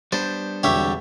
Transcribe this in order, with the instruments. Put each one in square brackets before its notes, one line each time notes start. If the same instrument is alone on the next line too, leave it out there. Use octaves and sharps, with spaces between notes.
[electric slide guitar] G3 B3 D4 [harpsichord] C5
[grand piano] E1 C2 D3 [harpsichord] G4 C#5 E5